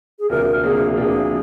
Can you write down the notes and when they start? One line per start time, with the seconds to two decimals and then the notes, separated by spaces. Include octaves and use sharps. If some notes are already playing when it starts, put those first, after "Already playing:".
0.19 G#4
0.30 D2 C3 F3 A#3 D4 A#4
0.63 D2 C3 F3 A#3 D4 G#4
0.97 D2 C3 F3 A#3 D4 G#4